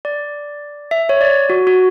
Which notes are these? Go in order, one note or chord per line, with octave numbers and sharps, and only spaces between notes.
D5
E5
C#5
D5
F#4
F#4